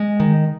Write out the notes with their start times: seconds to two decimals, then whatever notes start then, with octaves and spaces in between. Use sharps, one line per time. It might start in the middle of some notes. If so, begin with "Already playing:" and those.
Already playing: G#3
0.20 D#3